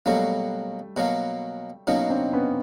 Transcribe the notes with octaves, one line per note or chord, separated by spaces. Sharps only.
B2 F#3 G3 A3 A#3
B2 F#3 A#3
B2 F#3 A#3 C#4 D#4
C4 D4
B3 C#4